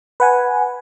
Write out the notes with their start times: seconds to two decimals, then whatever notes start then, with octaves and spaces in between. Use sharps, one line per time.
0.20 B4 F#5 G#5